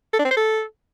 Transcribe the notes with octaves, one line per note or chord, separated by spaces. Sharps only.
A4
D4
C4
C5
A4